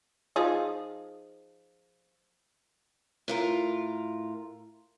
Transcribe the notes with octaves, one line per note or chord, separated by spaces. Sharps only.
F3 D#4 G#4
A2 F4 A#4